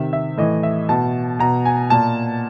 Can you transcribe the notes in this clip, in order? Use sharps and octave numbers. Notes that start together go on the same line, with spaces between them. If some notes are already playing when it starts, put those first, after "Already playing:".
Already playing: C3 D#3 E5
E5
A2 E3 D#5
E5
B2 A5
B2 A#5
G#5
A#2 A5